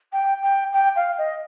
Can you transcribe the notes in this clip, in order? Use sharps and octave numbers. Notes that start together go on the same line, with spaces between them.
G5
G5
G5
F5
D#5